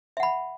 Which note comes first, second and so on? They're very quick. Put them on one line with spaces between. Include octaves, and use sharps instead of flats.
E5 F#5 B5